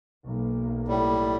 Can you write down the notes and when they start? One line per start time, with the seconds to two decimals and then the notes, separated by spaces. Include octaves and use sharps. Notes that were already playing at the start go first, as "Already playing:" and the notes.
0.25 B1 A#3
0.88 A2 G3